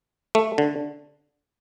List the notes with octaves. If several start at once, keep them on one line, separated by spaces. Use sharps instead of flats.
A3
D3